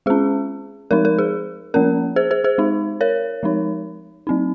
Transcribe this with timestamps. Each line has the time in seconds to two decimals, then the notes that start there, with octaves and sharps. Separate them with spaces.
0.06 G#3 C#4 G#4
0.91 F3 G#3 D#4 A#4
1.05 A#4
1.18 G#4
1.74 F3 A#3 C#4 A#4
2.16 G#4 C5
2.31 G#4 C5
2.44 G#4 C5
2.58 G#3 D#4
3.01 A#4 C#5
3.43 F3 G#3 D#4
4.27 F#3 C4 D#4